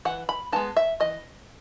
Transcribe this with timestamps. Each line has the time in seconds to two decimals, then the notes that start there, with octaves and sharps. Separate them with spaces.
0.05 E3 F#5
0.29 B5
0.52 G#3 B3 D#4 A5
0.77 E5
1.00 E3 D#5